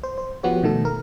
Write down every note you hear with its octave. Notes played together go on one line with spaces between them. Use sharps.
C5
C5
F3 B3 F#4 G4 C#5
B2 D#3 A3 A4
A#4